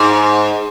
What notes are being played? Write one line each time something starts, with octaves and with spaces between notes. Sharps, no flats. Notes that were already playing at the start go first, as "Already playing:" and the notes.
Already playing: G#2